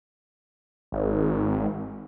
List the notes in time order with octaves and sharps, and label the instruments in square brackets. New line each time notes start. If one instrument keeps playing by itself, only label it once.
[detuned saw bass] G#1